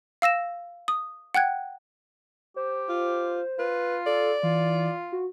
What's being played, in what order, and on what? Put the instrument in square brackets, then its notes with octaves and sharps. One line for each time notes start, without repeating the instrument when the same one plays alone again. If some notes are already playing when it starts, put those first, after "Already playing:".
[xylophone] F5 E6 A#6 E7
D#6
F#5 G5 F#6 G#6
[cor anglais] G4 [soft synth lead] C5
[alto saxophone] F4
[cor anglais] F4 [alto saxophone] B4
[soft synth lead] A4 [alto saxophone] D5
[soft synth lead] E3 [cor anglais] F4
[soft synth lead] F#4